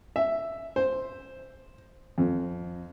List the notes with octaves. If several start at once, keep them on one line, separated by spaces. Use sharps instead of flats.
E5
C5
F2